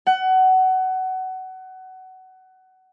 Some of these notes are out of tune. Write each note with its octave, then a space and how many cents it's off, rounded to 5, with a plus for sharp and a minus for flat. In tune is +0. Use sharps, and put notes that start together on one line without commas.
F#5 +20